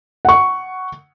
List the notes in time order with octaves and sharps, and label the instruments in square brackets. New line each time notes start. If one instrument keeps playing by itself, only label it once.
[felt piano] F#5 C#6